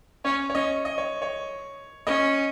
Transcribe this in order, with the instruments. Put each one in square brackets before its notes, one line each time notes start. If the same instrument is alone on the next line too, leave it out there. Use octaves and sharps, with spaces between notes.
[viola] C#4 [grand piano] C#5
[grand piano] C#5
[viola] C#4 [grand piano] D#5
[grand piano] D#5
C#5
C#5
[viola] C#4 [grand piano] D#5